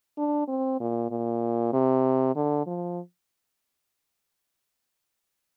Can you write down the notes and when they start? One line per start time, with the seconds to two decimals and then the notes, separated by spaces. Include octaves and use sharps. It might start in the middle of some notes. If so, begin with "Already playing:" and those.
0.18 D4
0.48 C4
0.80 A#2
1.10 A#2
1.73 C3
2.35 D3
2.67 F3